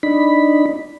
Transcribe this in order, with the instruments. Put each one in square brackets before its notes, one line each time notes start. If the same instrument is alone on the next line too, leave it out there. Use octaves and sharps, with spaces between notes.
[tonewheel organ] D4 D#4 B5